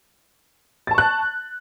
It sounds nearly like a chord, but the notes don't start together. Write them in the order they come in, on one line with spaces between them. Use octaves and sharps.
A6 A5 C#6 F#6